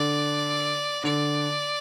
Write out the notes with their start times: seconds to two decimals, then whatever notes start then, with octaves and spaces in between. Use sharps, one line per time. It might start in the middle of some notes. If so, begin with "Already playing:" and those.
Already playing: D3 D5
1.04 D3 D5